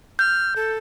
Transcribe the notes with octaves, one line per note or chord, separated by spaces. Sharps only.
F6 G6
A4